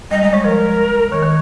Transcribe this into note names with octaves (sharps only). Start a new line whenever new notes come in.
G3 D#5
G#3 D#5
G#3 C#5
F3 A#4
D#3 C#5
D#3